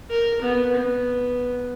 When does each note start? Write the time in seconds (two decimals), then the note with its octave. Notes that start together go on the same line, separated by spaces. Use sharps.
0.10 A#4
0.42 B3
0.75 B3